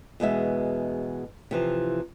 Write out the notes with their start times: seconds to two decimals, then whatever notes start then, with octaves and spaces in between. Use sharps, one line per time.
0.20 E2 B2 G#3 E5
1.51 C3 E3 F3